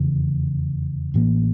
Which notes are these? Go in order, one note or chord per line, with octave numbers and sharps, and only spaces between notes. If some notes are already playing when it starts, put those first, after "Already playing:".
Already playing: F1 E2 C#3 E3
A1 A2 E3 A#3